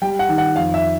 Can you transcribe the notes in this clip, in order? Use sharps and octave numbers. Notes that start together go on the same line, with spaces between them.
G3 G5
F#5
D#3
F#5
F2 F5
E5